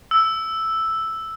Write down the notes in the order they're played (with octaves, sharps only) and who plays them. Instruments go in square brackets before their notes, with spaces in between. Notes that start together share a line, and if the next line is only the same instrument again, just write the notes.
[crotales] E6